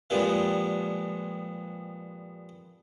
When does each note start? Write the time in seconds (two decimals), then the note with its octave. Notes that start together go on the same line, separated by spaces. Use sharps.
0.10 F2 A#2 F3 G3 G#3 B3